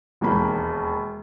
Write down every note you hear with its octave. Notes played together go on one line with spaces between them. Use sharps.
E1 D#2 A#3 B5